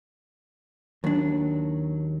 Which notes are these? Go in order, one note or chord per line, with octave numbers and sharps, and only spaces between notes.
D#2 F#3 D4